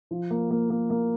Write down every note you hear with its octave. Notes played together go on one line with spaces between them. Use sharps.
F3
A#3
A#3
A#3
A#3